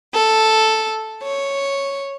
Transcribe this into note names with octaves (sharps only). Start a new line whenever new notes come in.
A4
C#5